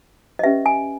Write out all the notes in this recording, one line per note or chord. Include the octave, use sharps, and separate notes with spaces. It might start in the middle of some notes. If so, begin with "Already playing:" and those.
D#5
C#4 G4 B4 E5
G#5